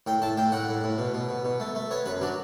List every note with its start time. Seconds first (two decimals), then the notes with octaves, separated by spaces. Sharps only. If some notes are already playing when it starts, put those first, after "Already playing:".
0.07 A2 G5
0.22 A2 A5
0.37 A2 G5
0.52 A2 F#5
0.69 A2
0.84 A2
0.98 B2
1.14 B2
1.29 B2
1.45 B2
1.60 A3
1.75 A3
1.91 B3 C#5
2.06 F#2 B4
2.22 F#3 D4